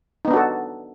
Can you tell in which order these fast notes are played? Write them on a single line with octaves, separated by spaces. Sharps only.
D#4 B3 D4 F#4 A4